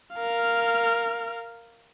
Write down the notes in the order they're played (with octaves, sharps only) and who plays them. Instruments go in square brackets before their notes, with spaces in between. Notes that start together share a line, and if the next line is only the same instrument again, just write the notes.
[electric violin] A#4 F5